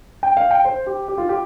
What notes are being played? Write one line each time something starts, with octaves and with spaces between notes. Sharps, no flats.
G5
F5
G5
C5
G4
G4
F4
G4